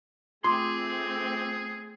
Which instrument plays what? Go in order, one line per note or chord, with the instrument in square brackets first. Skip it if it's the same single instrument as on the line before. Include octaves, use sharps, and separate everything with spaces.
[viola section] A3 C4 [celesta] F4 D6 D#6 [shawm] G#4 [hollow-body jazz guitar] C6